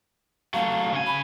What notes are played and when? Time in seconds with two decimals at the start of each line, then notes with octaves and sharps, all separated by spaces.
0.54 F#3 A3 F5
0.93 C#3 G#5
1.07 B5